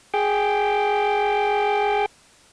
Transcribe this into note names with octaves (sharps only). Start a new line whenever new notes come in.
G#4 G5